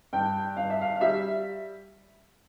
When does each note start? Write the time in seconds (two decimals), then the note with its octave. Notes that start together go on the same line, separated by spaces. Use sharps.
0.13 G2 G5
0.57 G2 F5
0.70 E5
0.81 F5
0.96 F5
1.01 G3 E5